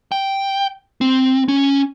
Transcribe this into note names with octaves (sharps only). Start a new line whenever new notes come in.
G5
C4
C#4